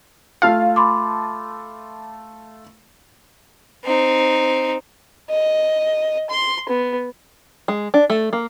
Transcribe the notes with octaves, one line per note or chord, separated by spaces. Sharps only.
A3 F4 F5 A5
B5 C6 D6
C4 D#4
D#5
C6
B3
G#3
D4
A3
A#3